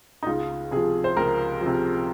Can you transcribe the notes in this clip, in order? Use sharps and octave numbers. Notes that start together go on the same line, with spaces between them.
D#4
C#2 F4
C3 F3 G#4
C5
C#2 A#4
C3 F3